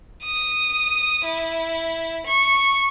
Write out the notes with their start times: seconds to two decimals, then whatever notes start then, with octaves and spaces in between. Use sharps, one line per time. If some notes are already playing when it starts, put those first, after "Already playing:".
0.24 D#6
1.25 E4
2.26 C#6